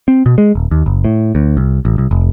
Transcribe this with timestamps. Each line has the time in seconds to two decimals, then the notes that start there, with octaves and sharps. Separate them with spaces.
0.08 C4
0.26 B2
0.38 G#3
0.55 D#1
0.71 D#2
0.86 F#1
1.04 A2
1.35 D2
1.57 C2
1.85 A1
1.98 C2
2.11 F1